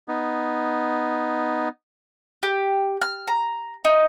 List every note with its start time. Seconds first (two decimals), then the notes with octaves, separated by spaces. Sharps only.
0.08 B3 D#4
2.43 G4
3.02 F6
3.28 A#5
3.85 D#4